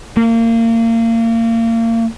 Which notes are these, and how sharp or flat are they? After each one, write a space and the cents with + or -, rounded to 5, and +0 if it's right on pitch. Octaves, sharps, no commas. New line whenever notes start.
A#3 -30